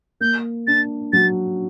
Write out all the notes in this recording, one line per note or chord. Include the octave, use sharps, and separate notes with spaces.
A#3 G6
D4 A6
F#3 A6